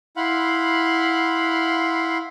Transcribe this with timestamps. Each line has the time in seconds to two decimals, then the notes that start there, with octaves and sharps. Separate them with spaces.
0.17 E4 F5 F#5 B5 C6